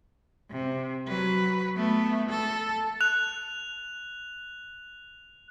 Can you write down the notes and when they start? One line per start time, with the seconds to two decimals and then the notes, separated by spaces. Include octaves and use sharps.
0.51 C3
1.08 F#3 B4
1.76 A3 B3
2.30 A4
3.01 F#6 F7